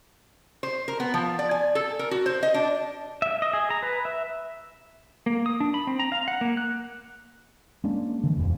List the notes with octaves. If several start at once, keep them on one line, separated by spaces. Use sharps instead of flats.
C5
A#4
B3
F3
D5
G#5
A4
A#4
F#4
C5
D#5
D4
E5
D#5
G#4
A#5
B4
E5
A#3
D#6
D4
B5
C4
A#5
F5
F#5
A#3
F#6
G#3 A#3 C#4 D4
D3 E3
D#1 F2